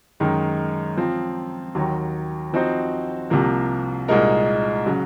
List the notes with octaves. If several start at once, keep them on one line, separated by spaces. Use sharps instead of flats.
F#2 D#3 G#3
F3 C4 F4
D#2 D#3 F#3
F3 C4 D#4 F#4 C5
C2 C3 F3 A#3
C2 A#2 G#3 D#4 A#4
C#3 F#3